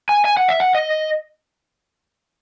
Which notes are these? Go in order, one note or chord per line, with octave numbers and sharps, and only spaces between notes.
G#5
G#5
F#5
E5
F#5
D#5